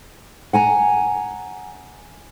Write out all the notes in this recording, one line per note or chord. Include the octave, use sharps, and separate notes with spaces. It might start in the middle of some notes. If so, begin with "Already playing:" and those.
F#5 G#5 A#5